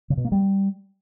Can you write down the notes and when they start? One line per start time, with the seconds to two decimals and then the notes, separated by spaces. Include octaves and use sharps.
0.10 C#3
0.17 B2
0.25 A#3
0.32 G3